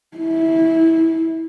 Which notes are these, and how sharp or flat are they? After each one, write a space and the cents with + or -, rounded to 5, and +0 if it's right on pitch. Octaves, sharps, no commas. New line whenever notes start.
E4 -20